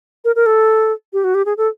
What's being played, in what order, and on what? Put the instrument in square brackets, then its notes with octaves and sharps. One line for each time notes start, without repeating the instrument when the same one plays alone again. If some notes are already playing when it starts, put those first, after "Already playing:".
[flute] A#4
A#4
A4
G4
F#4
G4
G#4
A4